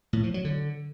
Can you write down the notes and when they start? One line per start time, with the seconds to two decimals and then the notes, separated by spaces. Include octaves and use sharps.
0.13 A2
0.23 F3
0.34 F#3
0.45 D3